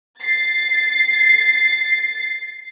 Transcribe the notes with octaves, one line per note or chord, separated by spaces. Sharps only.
A6 C7